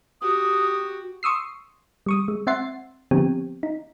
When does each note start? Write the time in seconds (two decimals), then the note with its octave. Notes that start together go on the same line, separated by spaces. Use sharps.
0.21 F#4 G4 D#6
1.23 C6 C#6 D#6 E6 C7
2.06 G3 C#6 D#6
2.28 G#3
2.47 C4 E5 F#5 C6 A6 C7
3.11 D3 F3 B3 C4 G4
3.63 D#4